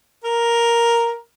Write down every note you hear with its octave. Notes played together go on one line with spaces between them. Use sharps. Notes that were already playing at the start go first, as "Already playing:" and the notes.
A#4